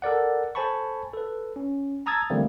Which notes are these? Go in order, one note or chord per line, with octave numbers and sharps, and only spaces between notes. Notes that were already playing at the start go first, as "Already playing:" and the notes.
A4 A#4 D5 F#5
A4 C5 G#5 A5 B5 C#6
A4 B4
C#4
A5 A#5 D#6 E6 G#6 A6
D3 E3 G3 A3 A#3 C4